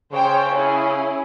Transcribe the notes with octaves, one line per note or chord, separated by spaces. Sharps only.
C#3 C5 C#5 G5
C#4 E4 G#4